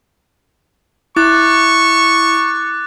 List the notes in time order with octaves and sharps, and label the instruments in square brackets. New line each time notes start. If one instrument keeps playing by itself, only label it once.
[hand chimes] E4 [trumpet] C#6 [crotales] D6 F#6 A6